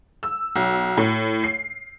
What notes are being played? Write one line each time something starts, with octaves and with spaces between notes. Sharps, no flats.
E6
B1
A2
C7